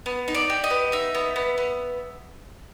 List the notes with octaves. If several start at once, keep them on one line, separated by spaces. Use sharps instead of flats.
B3
D#4
D5
G4
D#5
B3
D#4 E5
B3
B3
B3